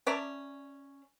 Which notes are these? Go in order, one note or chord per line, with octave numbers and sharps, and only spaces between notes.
C#4 D5 E5 A#5